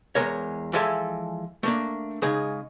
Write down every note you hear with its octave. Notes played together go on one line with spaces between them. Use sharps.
E2 G#3 A#4 C#5
E3 F3 G#3 A4 E5 G#5
A3 A#3 D4
C#3 G#3 D#4 G#4